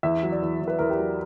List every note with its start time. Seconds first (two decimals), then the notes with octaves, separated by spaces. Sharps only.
0.03 E2 E5
0.23 F#3
0.32 D5
0.42 E2
0.61 E2
0.68 B4
0.79 E2 A#4
0.90 G4
0.99 F#3